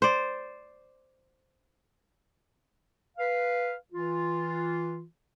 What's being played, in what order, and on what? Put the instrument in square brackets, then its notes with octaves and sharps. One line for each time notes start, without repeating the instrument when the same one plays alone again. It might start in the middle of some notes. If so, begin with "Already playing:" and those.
[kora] C5 D5
[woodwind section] B4 F5
E3 F4